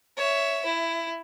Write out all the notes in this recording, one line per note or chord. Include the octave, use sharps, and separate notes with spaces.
C#5 E5
E4